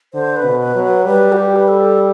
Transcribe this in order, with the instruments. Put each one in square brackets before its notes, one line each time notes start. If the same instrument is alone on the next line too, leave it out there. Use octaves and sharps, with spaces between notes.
[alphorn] D3 [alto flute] C5
[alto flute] B4
[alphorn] B2
[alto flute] B4
[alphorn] F#3
[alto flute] B4
[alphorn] G3 [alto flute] B4
[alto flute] F#4
G4
B4
A4